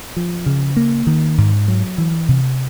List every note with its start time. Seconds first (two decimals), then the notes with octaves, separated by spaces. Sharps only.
0.16 F3
0.46 C#3
0.77 A#3
1.07 D#3
1.38 G#2
1.68 F#3
1.98 E3
2.28 C3